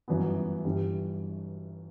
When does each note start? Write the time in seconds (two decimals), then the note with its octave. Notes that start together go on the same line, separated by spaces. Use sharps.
0.08 G1 F#2 E3 B3
0.64 G1 G2 E3 G3